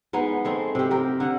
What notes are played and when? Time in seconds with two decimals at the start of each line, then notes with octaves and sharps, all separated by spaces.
0.13 G#3 B3 D#4
0.45 G#3 A3 C4
0.75 C3 G4
0.91 G4 A#4
1.20 D3 F#5